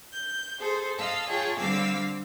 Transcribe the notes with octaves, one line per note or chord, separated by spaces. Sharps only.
G6
G#4 A4 C5
D#5 F5 A5 E6
F4 G#4 C#5 G5 A5
D3 G3 C4 F5 D6 E6